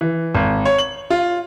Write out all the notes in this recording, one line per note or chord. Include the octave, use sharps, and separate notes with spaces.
E3
G#1
C#5
F#7
F4